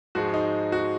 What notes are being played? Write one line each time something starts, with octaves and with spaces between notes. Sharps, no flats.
G#2 F3 G#3 F#4
D#4
F#4